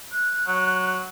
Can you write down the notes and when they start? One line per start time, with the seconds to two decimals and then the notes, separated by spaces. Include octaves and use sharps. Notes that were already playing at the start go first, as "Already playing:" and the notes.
0.12 F#6
0.47 F#3